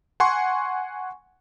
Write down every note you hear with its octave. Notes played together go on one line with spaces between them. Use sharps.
F#5 G#5 C6 C#6